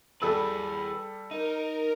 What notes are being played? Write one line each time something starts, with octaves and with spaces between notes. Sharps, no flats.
G3 G#4 A4 B4 E6
D#4 A#4